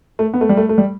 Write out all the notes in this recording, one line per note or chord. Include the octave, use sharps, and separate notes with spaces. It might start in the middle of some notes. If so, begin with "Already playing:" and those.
A3
B3
A3
G3
A3
A3
G3